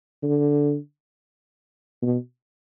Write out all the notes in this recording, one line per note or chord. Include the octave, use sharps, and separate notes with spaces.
D3
B2